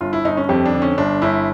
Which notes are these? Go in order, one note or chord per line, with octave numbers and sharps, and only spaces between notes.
G1 F4
E4
G1 D#4
C#4
F2 G4
D4
D3
C#4
G1 D4
G1 E4